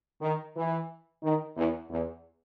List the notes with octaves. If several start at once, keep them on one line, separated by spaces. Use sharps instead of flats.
D#3
E3
D#3
E2
E2